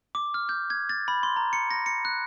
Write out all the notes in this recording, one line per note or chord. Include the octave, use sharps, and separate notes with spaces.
D6
F6
G6
G#6
A6
B5
C6
A#5
C#7
A#6
C#7
F#6